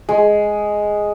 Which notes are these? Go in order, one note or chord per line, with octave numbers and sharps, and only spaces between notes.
G#3